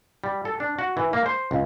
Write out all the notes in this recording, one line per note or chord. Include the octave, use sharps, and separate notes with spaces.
G3
A4
D4
F#4
E3
A#3
C5
C#2